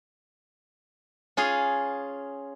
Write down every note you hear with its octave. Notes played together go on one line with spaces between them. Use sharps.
C#4 F4 G#4